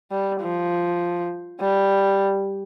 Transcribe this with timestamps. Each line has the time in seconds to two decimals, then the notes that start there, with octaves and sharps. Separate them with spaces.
0.11 G3
0.41 F3
1.60 G3